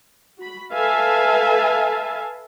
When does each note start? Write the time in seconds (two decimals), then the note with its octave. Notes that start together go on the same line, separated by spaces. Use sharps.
0.38 F#4 B5
0.73 A4 B4 E5 F5 G#5 A5